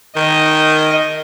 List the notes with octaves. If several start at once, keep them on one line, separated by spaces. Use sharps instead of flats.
D#3 D#5